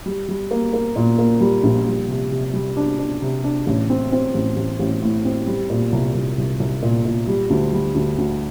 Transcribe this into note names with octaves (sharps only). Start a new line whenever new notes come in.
G3
G3
A#3
A#3
A#2
A#3
G3
A#1
G3
C3
C3
G3
D4
D4
C3
D4
A1
C4
C4
A1
A1
A1
A2
C4
G3
A#2
C2
C2
C2
C2
A#2
A#2
G3
D2
G3
D2
D2